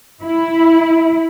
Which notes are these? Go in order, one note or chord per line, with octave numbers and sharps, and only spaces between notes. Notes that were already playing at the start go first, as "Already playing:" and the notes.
E4